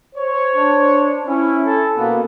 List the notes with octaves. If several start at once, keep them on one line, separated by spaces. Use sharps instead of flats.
C5 C#5
D4
C#4 E4
A4
B2 A#3 B3